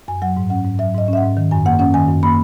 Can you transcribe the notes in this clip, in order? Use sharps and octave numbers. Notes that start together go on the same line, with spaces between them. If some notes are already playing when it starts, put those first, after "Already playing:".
F#2 G#5
F#3 F#5
G#2
C#4 F#5
G#2
F#3 E5
G#2 D#5
C#4 E5
F#5
G#2
D#3
F#2 G#5
A#3 F#5
C#4 F#5
D#3 G#5
F#2
A#3 B5